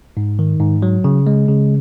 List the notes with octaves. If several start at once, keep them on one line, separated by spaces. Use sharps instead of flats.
G#2
D#3
G#2
F#3
C#3
G#3
C#3